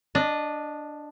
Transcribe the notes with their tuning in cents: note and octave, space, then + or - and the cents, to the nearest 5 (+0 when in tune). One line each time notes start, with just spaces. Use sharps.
D4 +0 D#5 -20